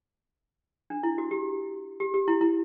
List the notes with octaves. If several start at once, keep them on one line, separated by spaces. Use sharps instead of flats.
D4
E4
F#4
G4
G4
G4
E4
E4